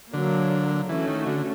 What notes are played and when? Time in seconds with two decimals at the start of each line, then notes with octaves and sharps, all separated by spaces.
0.13 D3 F#3 A#3 D4
0.89 E3 A3 C#4 F#4
1.08 D#3
1.26 D3